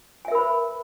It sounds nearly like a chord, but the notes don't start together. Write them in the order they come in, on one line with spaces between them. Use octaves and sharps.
G#5 E5 A#4 B5 B4